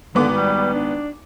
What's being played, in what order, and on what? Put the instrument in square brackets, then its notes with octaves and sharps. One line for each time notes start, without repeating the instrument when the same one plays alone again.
[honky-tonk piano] G#1 B3 D6 [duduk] D3
[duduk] G3
D4